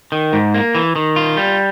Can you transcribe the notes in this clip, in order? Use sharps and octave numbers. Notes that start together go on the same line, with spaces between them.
D#3
G#2
A#3
E3
D#3
F4
G3